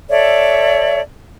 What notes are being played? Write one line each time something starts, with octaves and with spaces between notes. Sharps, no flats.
A4 C#5 D5 E5